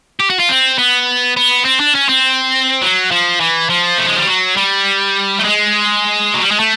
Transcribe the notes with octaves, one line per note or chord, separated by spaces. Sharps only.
G4
F#4
F4
C4
B3
B3
C4
D4
C#4
C4
F#3
F3
E3
F3
A3
G#3
G3
F#3
G3
A3
G#3
F#3
G3
G#3
A3